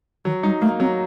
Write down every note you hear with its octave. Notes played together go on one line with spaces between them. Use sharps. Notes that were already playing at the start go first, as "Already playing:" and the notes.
D#3 F#3
G3 D#4
A3 A#3
F#3 C4